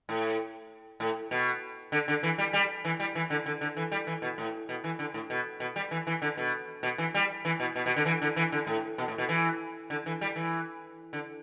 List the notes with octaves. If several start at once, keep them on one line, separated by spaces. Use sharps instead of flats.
A2
A2
B2
D3
D3
E3
G3
G3
E3
G3
E3
D3
D3
D3
E3
G3
E3
B2
A2
B2
E3
D3
A2
B2
B2
G3
E3
E3
D3
B2
B2
E3
G3
E3
B2
B2
B2
D3
E3
D3
E3
D3
A2
B2
A2
B2
E3
D3
E3
G3
E3
D3